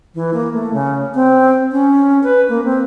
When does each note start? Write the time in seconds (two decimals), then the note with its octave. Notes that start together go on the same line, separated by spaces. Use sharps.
0.15 E3
0.34 A#3
0.53 A3
0.73 C#3
1.14 C4
1.72 C#4
2.24 B4
2.49 A#3
2.65 C4